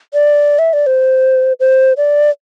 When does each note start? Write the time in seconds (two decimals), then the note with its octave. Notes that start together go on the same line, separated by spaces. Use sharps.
0.14 D5
0.59 E5
0.73 D5
0.87 C5
1.60 C5
1.97 D5